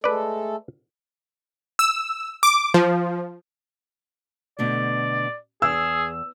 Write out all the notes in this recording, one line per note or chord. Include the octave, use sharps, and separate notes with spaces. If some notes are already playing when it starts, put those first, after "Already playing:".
G#3 A3 A4 B4 D5
E6
D6
F3
B2 D3 A3 D5
E2 G#4 E6